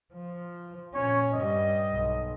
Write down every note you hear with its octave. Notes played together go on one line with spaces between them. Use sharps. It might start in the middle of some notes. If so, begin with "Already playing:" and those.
F3
A#2 C#4 C#5
G2 G3 D#5
B1